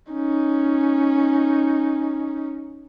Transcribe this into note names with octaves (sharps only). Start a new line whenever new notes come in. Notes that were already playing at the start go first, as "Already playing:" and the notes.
C#4 D#4